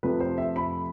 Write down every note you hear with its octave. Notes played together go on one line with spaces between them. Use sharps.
F2 C3 F3 A3 C4 B4
C5
E5
B5